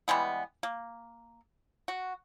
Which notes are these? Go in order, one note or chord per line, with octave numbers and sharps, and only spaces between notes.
E3 G3 G#3 B3
A#3
F#4